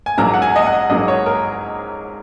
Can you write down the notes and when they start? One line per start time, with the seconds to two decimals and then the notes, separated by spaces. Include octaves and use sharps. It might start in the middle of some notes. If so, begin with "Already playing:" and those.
0.06 G#5
0.17 A#1 G#2 F#3 A#3 A#5
0.33 F#5
0.42 G#5
0.56 D#5
0.66 F#5
0.89 A#1 G#2 F#3 A#3 D#5
1.08 C#5
1.26 A#4